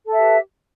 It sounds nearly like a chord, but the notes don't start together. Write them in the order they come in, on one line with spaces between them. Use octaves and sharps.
A4 E5 G4 B4